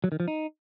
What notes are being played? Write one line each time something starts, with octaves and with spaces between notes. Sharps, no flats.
F#3
D#3
F3
D#4